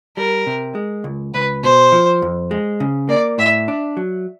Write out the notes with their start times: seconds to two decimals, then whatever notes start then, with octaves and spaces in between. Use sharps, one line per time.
0.17 G3 A#4
0.47 C3
0.75 G#3
1.04 C#2
1.34 C#2 B4
1.63 B2 C5
1.92 F3
2.22 F2
2.51 G#3
2.80 C#3
3.09 A#3 D5
3.38 A2 E5
3.68 D4
3.97 F#3